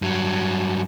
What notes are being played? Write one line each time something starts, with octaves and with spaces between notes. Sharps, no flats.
G2 F#3